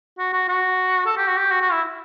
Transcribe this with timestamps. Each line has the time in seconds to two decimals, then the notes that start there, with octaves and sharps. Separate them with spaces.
0.19 F#4
0.33 F#4
0.48 F#4
1.06 A4
1.17 G4
1.27 F#4
1.37 G4
1.51 F#4
1.62 F#4
1.72 E4